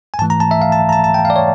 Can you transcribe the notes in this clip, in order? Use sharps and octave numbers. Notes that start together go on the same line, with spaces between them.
G#5
G#2 E3 A3 A5
A#5
A5
E5
F5
A5
A#5
A5
A5
G5
F5
D5
C#5